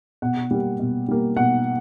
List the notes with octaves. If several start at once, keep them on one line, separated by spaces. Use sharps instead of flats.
B2 F#5
G3 A#3
B2
G3 A#3
B2 F#5